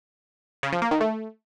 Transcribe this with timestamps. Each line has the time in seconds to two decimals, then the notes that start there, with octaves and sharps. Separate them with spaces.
0.63 C#3
0.72 F3
0.82 A#3
0.91 D#3
1.01 A3